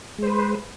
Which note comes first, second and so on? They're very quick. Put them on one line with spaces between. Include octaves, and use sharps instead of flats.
G#3 C5 B4